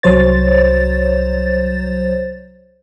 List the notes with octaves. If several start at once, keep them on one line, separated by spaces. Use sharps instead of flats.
C2 F#3 C5 C#5 A6